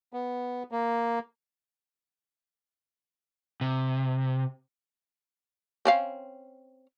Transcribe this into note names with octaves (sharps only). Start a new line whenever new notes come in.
B3
A#3
C3
C4 C#4 F5